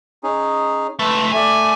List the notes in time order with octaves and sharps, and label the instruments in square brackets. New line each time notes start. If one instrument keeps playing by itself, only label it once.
[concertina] C#4 D#4 G#4
[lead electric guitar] C#2 A3 [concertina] B4 A5
[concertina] A3 [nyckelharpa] D5 E5 [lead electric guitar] G#5